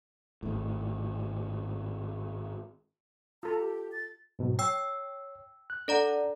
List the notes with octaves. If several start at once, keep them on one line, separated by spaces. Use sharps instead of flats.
G#1 A2
F4 A4 A#5
G4
A6
G#2 B2 F#3
C#5 G5 E6
F#6
D4 A4 D5 F#5 A#5